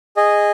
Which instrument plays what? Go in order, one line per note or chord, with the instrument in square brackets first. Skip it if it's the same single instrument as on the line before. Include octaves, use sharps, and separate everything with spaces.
[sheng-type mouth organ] G#4 D#5